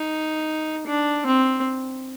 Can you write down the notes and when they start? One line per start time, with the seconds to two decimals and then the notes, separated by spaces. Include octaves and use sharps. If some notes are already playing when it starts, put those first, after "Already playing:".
Already playing: D#4
0.87 D4
1.26 C4